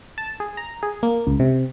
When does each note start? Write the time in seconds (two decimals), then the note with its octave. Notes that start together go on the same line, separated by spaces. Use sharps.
0.18 A5
0.40 G#4
0.57 A#5
0.83 G#4
1.03 A#3
1.27 C#2
1.40 C3